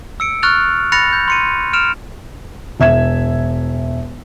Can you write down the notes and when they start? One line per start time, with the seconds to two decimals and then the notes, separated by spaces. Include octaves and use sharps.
0.20 E6 C#7 D7
0.43 C#6 F6 F#6 A6 F7
0.92 B5 F#6 A6 A#6 C#7 F7
1.13 G6
1.28 C6 C#7 D#7
1.73 F6 D7 E7 F7
2.80 E1 E5 G#6 E7